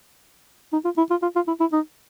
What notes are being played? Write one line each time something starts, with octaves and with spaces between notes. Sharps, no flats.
D#4
F4
E4
F4
F4
F4
E4
E4
D#4